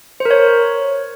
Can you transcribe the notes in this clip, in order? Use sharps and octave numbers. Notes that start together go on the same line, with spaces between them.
C5
A#4
C#5